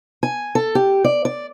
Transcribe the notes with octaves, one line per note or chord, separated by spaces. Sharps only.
G#5
A4
G4
D5
D5